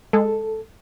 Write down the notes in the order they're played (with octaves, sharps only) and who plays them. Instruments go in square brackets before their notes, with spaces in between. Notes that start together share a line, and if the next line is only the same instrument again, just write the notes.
[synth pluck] G#3 [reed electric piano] A4